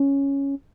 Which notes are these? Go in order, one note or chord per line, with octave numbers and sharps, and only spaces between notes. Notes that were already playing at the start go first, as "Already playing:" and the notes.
Already playing: C#4